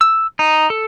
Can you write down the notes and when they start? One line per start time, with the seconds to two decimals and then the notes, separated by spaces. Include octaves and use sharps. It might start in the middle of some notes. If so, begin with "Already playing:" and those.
0.01 E6
0.39 D#4
0.70 A4